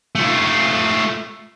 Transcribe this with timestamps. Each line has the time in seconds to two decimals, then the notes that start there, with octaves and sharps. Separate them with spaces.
0.15 A3 F4